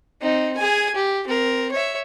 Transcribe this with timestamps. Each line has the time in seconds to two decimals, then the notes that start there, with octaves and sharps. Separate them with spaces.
0.22 C4 D#4
0.57 G#4 G#5
0.95 G4
1.27 C4 A#4
1.72 C#5 E5